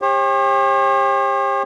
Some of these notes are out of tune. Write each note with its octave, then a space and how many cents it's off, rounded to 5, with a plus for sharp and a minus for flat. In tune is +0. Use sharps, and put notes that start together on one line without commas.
G4 +30 C#5 -45